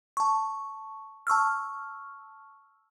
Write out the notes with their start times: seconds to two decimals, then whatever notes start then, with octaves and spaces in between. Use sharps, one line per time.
0.17 A5 C#6
1.27 A5 C#6 E6 F6